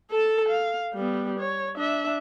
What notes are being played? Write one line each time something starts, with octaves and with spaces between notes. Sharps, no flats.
A4 A5
F5
G3 B3
C#5
D4 E5